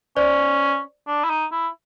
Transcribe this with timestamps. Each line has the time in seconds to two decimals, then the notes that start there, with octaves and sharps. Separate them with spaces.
0.17 C#4 C5 D5
1.07 D4
1.24 E4
1.30 D#4
1.52 E4